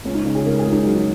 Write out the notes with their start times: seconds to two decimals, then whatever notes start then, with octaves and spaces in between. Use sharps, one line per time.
0.05 C#2 C#4
0.15 D#4
0.25 C#3 C#4
0.35 G#4
0.46 C#2 A#4
0.59 G#4
0.65 C#2
0.72 D#4
0.86 F#3